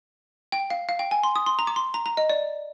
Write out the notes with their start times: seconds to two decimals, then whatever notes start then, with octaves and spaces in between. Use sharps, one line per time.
0.52 G5
0.70 F5
0.89 F5
0.99 G5
1.11 G#5
1.23 C6
1.36 D#6
1.46 C6
1.59 A#5
1.67 D6
1.76 C6
1.94 A#5
2.06 A#5
2.17 D#5
2.30 D5